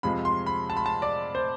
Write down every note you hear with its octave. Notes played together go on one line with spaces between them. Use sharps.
F2 C3 F3 G#3 B5
C6
B5
A5
B5
A5
D5
C5